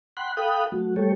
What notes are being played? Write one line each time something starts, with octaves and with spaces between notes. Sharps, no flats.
F#5 G5 B5 C6 F#6
A4 F5 G5 B5 D#6 F#6
F#3 A3 F#4
G3 A3 G4 A4 C#5